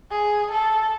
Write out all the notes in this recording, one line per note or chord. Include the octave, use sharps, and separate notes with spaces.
G#4
A4